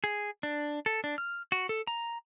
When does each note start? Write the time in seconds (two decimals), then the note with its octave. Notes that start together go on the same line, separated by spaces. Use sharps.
0.04 G#4
0.43 D4
0.86 A4
1.04 D4
1.18 F6
1.52 F#4
1.69 A4
1.87 A#5